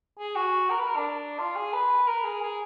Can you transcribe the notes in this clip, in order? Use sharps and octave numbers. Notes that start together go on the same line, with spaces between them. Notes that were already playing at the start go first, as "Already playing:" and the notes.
G#4
F#4
A#4
B4
A#4
D4
F4
G#4
B4
A#4
G#4
G#4